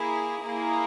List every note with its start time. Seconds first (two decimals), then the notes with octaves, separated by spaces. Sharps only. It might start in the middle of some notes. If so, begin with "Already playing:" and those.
Already playing: A#3 E4 G#4
0.44 A#3 E4 G#4